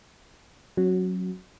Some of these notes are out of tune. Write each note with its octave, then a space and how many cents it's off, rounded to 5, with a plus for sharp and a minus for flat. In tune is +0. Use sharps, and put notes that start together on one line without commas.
F#3 -5 C#4 -40 F#4 +0